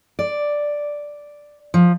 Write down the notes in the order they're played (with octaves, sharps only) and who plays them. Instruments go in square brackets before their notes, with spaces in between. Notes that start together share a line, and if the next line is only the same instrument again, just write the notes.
[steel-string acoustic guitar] D5
F3